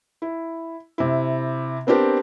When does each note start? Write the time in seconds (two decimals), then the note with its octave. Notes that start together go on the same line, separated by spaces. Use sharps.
0.22 E4
0.98 C3 E4
1.87 B3 C4 D4 G4 A#4